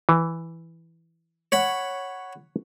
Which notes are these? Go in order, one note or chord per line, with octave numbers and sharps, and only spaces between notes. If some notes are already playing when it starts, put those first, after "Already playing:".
E3
C#5 F#5 B5